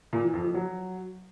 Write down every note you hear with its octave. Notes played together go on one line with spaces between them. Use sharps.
A#2
E3
F2
F3
F#3